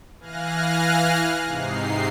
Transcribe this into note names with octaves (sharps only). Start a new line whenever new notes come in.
E3 F5 G#5 F6 F#6 A#6
G#2 C3 D#4 C7